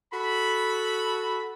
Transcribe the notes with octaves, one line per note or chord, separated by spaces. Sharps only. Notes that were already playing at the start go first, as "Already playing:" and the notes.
F#4 A4 B5